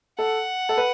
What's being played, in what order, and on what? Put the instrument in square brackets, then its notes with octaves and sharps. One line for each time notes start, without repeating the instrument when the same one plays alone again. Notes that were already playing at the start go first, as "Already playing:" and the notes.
[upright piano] A4 [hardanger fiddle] F#5
[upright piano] A4
B4